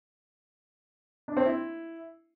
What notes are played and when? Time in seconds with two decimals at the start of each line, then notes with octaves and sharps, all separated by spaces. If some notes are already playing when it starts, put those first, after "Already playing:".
1.28 D4
1.37 C4
1.45 E4